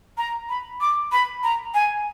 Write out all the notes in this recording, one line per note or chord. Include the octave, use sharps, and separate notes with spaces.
A#5
B5
D6
B5
A#5
G#5